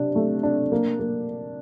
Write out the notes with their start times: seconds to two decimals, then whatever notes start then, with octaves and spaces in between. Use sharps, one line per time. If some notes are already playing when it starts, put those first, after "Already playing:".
Already playing: C3 D4
0.15 A3
0.43 D4
0.72 A#3
1.00 A#3